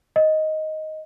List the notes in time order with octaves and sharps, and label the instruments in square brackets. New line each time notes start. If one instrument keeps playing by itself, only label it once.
[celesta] D#5